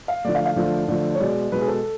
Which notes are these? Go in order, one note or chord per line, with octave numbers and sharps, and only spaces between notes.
F5
D3 F3 A3 D5
F5
F5
D3 F3 A3
D3 F3 A3
C#5
B2 G#3 D5
B2 G#3 B4
G#4
A4